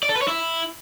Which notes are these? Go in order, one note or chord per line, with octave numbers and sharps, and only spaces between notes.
D5
A4
B4
C#5
E4